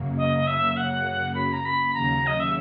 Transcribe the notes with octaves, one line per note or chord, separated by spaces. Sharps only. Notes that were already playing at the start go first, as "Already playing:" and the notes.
Already playing: F#2 C#3 F#3 A#3
D#5
E5
F#5
B5
A#5
B5
D#2 C#3 F#3 A#5
D#5
E5